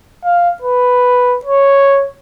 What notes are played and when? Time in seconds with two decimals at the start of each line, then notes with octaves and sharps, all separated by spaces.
0.25 F5
0.62 B4
1.45 C#5